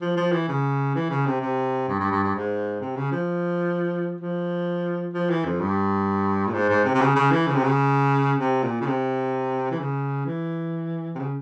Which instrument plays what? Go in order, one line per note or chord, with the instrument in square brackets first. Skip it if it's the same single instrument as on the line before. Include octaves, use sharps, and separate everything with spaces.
[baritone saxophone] F3
F3
E3
C#3
E3
C#3
C3
C3
G2
G2
G2
G2
G#2
C3
C#3
F3
F3
F3
E3
F2
G2
A#2
G#2
G#2
C3
C3
C#3
C#3
E3
C#3
C3
C#3
C3
A#2
C#3
C3
E3
C#3
E3
C3
C#3